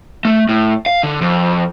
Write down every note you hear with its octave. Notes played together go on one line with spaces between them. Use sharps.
A3
A2
F5
D3
F2